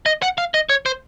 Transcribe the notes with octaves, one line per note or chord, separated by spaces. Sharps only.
D#5
F#5
F5
D#5
C#5
C5